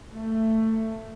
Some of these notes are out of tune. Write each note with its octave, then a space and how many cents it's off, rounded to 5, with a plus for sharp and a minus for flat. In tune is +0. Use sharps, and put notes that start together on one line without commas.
A3 +15